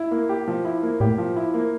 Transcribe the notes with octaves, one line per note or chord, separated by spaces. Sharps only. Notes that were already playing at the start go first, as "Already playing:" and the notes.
Already playing: E4
A#3
G4
F3
E4
A#3
A2 G4
F3
E4
A#3